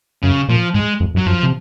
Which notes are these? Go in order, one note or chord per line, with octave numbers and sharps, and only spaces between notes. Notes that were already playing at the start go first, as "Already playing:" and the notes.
F#2 C#3
A#2 F3
G#2 G#3
F2
F#2
F#3
F#2 F3
C3